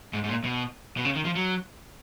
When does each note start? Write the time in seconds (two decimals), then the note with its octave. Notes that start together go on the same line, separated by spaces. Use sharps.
0.13 G#2
0.24 G#2
0.29 A#2
0.44 B2
0.97 B2
1.05 C#3
1.15 D#3
1.25 F3
1.35 F#3